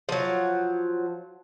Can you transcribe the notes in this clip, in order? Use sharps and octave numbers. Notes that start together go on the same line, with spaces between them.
F3 F#3